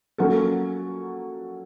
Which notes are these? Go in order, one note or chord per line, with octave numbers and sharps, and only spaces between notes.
F#3 A#3 C#4 F#4 A4